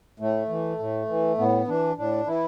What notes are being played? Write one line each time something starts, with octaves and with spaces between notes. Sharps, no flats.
A2 A3
E3
A2
E3
A2 B3
E3 D4
A2 D4
E3 E4